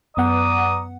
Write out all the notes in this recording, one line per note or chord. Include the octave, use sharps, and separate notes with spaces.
F#2 B3 D5 F#5 A#5 D#6